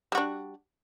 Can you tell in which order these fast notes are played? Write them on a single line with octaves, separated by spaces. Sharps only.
G3 F#4 D4